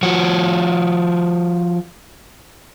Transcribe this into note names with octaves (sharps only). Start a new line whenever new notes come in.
F3 F#4